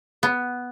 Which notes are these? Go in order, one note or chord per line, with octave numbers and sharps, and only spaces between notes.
B3